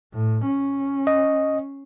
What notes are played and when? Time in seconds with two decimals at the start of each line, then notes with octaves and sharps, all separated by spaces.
0.14 A2
0.47 C#4
1.07 D#5